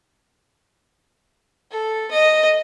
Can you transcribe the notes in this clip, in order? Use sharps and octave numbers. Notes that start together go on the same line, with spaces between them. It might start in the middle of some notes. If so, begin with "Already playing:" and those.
A4
D#5